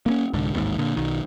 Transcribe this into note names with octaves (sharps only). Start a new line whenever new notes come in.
A#3 B3 C#4
C2 G#2 D3
A1 D#2 G#2
A#2 D3
B1 D#3